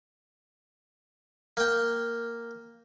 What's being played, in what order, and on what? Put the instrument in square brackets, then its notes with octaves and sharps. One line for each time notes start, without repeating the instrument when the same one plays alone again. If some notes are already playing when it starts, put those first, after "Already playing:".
[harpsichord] A#3 G5